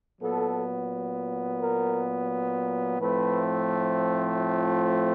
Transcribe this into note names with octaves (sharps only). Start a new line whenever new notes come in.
A#2 F#3 B3 A4
A#4
A2 F3 A3 C4 B4
F4